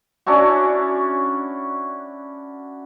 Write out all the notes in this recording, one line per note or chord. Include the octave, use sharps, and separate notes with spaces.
C#4 D4 E4 F#4